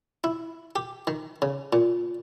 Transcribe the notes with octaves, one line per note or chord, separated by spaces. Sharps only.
E4
G4
D#3
C#3
A#2